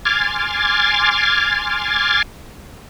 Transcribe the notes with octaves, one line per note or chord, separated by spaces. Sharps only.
G#5 C6 D6 F6 G#6 A6